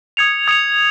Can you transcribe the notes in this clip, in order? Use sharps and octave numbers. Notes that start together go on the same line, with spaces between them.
D#6 G#6 C#7 F7
D#6 G#6 C#7 F7